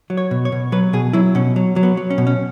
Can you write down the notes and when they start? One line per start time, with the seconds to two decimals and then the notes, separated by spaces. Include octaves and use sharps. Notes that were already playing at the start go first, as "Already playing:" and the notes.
0.10 F#3
0.17 C#5
0.31 B2
0.45 C#5
0.52 B2
0.72 F#3 B4
0.93 B2 G#4
1.13 F#3 E4
1.35 B2 C#4
1.56 F#3
1.76 F#3
1.83 B3
1.97 F#3
2.10 C#4
2.18 B2
2.27 C#4